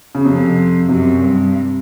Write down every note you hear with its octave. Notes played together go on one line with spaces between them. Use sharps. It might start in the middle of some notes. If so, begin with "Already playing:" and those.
C#3
F2 C3
F#2 C3
G2